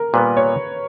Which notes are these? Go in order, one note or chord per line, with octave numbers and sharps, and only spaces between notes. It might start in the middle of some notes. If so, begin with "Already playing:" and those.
Already playing: A#4
A#2 G3 B3 B4
C#5